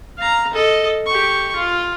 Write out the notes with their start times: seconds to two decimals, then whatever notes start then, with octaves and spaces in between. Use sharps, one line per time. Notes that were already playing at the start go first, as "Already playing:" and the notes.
0.18 F5 A#5
0.53 A4 D#5
1.06 G4 C#6
1.56 F4